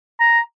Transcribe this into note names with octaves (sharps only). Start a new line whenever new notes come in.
A#5